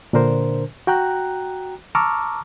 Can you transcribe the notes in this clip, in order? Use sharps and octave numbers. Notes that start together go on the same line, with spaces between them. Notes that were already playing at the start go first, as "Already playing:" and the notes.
A#2 D3 D4 A#4 C5
F#4 G5 A#5 F#6
A5 A#5 C#6 D6 E6 F6